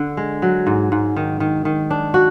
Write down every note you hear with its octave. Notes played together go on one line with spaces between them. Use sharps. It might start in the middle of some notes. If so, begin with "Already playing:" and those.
Already playing: D3
G#3
F#3
G#2
G#2
D#3
D#3
D#3
D4
F#4